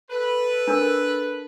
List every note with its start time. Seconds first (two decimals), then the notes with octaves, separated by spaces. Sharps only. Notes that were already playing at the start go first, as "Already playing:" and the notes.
0.10 A4 B4
0.68 D4 A#4